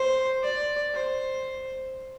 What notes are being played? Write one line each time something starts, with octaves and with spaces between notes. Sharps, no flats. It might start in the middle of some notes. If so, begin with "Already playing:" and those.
Already playing: C5
D5
C5